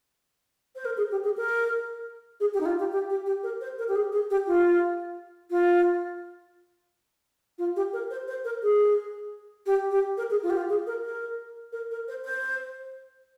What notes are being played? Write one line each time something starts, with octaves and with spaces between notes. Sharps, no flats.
C5
A#4
G#4
G4
G#4
A#4
G#4
G4
D#4
F4
G4
G4
G4
G4
A#4
C5
A#4
G4
G#4
G#4
G4
F4
F4
F4
G4
A#4
C5
C5
A#4
G#4
G4
G4
A#4
G#4
F4
G4
F4
G#4
A#4
A#4
A#4
A#4
C5
C5